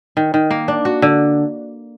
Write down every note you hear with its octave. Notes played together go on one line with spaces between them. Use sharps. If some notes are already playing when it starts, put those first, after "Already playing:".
D#3
D#3
A#3
D4
F#4
D3